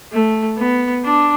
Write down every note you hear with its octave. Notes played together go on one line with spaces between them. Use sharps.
A3
B3
D4